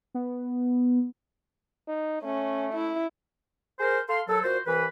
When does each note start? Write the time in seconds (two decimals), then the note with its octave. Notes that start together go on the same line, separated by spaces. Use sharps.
0.14 B3
1.88 D#4
2.23 A3 C#4
2.73 E4
3.79 G#4 A#4 C5
4.08 A4 F5 C6
4.27 D#2 F#3 A4
4.43 A#2 F#4 C5
4.66 C2 E3 B4